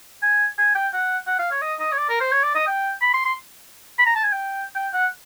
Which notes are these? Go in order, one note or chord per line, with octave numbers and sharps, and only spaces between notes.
G#5
G#5
G5
F#5
F#5
F5
C#5
D#5
D#5
C#5
D5
A#4
C5
C#5
D5
D#5
G5
B5
C6
C6
B5
A#5
A5
G#5
G5
G5
F#5